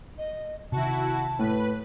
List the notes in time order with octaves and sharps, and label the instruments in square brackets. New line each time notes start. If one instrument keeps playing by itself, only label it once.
[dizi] D#5
[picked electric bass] C3 D#3 [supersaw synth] E4 F#4 [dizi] A5
[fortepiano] A2 [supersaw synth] B4